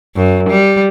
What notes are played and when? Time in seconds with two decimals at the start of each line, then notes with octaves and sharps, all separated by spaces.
0.17 F#2
0.49 G3